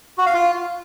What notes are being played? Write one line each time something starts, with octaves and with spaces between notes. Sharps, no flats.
F#4
F5
F4